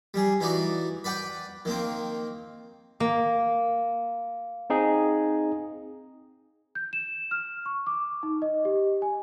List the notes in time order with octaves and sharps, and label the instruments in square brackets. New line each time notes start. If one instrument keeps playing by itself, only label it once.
[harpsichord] G3 G#4
E3 D#4 F#4 D5
B4 D5 F#5 G5
D#3 A#3 C4
[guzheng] A#3
[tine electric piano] C4 D#4 G#4
[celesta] G6
E7
F6
C#6
D6
D#4
D#5
G4
G#5